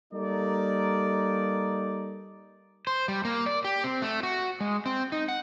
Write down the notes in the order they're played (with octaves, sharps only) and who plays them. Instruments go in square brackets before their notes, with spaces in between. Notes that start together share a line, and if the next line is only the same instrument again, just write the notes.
[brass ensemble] G3 A#3 D#4 A4 D5
[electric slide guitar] C5
G3
A#3
D5
G4
C4
A3
F#4
G#3
C4
D#4
F#5